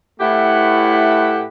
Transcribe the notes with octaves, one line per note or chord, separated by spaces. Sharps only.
A2 A3 E4 G4 B4 F#5